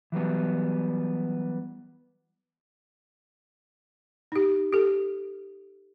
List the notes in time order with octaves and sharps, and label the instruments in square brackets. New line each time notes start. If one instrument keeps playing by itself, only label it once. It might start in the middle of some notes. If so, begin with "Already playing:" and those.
[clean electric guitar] E3 F#3 G3 B3
[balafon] D#4 G4
G4 A4